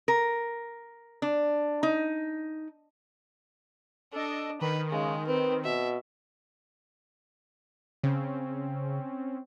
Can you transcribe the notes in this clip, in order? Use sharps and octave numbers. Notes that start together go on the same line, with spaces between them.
A#4
D4
D#4
D4 A4 D#5
D#3 B4
C#3 G#3
C4 B4
B2 E5
C#3 C4 C#4